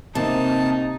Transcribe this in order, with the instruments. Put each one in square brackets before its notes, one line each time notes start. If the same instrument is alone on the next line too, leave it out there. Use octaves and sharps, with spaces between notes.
[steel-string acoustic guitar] C3 [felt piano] A#3 C4 [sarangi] D#4 [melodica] A5